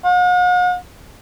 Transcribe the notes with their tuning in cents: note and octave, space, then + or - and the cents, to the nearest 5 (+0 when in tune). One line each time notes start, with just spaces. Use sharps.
F#5 -45